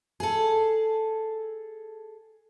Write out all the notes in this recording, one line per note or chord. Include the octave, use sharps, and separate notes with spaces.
G#4 A4